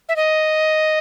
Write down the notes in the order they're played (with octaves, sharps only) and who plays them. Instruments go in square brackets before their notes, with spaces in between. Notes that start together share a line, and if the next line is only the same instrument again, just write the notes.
[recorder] E5
D#5